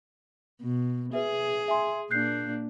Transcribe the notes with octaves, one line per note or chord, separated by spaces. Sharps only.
B2
G#4 B4 E5
E5 G#5 C6
A#2 A#3 D4 F#6 G6 C7